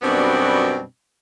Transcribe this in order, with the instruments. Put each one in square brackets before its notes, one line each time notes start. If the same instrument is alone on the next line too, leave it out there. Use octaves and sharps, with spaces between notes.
[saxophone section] F#2 B2 G3 B3 C4 D4